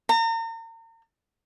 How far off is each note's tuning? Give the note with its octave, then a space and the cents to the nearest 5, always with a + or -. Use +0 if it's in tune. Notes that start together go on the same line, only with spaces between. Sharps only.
A#5 -40